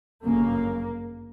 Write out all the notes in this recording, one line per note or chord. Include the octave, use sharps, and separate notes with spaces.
G1 F#2 C#3 A#3